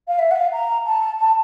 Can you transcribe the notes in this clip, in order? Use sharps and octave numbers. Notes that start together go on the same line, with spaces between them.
F5
E5
F#5
F5
A#5
A5
A5